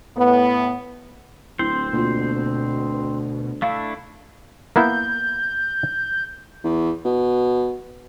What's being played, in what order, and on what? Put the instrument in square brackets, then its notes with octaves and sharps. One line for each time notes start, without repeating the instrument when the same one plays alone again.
[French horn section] A2 B3
[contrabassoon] D1 [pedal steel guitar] C4 C5 [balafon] E4
[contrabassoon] D2 [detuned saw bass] B2 [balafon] A#3 F4
[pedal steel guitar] A3 D4 E4 [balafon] F5
[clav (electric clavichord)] A#3 B3 E4 [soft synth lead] G6
[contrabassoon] E2
B2